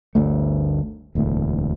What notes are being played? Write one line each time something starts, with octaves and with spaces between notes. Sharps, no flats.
G1 D2 A3
E1 D2 A2